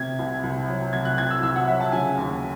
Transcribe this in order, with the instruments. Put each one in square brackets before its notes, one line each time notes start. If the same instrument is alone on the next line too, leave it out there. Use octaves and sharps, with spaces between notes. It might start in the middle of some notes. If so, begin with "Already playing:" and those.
Already playing: [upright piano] C3 G#6
C2
C2
F#3
C3 G#6
F#6
C2 G#6
E6
C2 E6
F#5
F#3 E5
A5
C#3 G#5
D#2